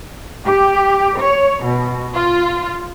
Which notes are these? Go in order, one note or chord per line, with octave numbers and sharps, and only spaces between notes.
G4
C#5
B2
F4